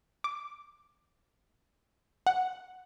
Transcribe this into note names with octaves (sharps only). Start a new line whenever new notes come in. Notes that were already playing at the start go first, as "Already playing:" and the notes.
D6
F#5